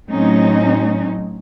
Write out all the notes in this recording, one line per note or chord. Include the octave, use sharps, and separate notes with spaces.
A2 F#3 C4 C#4 D#4